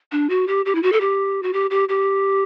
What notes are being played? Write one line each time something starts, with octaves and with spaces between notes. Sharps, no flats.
D4
F#4
G4
G4
E4
F#4
A4
G4
F#4
G4
G4
G4